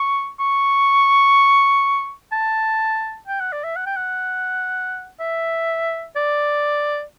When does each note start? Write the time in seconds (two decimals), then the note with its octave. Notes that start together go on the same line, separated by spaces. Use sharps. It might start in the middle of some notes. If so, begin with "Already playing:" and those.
Already playing: C#6
0.40 C#6
2.32 A5
3.28 G5
3.41 F#5
3.52 D5
3.64 E5
3.76 F#5
3.86 G5
3.96 F#5
5.20 E5
6.16 D5